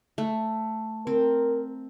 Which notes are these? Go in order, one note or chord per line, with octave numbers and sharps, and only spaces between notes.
A3
C4 A#4